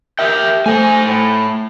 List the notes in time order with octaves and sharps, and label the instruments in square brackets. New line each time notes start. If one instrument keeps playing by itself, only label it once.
[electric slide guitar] G4 A#4 G5 [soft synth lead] E5
[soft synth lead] A3 [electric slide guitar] C5 G#5
[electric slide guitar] A2